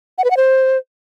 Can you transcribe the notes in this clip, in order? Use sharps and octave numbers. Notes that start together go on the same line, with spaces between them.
F#5
B4
F#5
C5